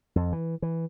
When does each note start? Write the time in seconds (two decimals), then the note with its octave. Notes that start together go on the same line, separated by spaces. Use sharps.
0.16 F2
0.32 E3
0.62 E3